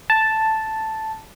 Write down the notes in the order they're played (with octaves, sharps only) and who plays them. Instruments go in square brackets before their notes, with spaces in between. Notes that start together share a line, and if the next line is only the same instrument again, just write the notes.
[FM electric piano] A5